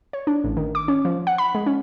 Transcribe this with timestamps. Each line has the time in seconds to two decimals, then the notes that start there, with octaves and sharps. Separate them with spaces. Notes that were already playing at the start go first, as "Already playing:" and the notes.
0.13 C#5
0.27 D4
0.44 A1
0.57 D#3
0.75 D6
0.88 C#4
1.05 F3
1.27 F#5
1.38 B5
1.55 G#3
1.66 C#4